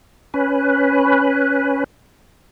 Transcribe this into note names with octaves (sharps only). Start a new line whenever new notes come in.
C#4 B4